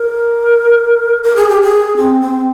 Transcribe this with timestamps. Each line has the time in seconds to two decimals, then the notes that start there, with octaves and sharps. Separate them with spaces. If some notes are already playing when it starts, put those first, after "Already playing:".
Already playing: A#4
1.23 A#4
1.36 G#4
1.48 G4
1.62 G#4
1.97 C4
2.21 C4